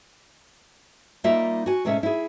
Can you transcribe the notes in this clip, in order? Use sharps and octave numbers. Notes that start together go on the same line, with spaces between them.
G3 A#3 D#4 F4 E5
F#4 G#5
A2 C3 G#3 C#4 E5
E4 G#4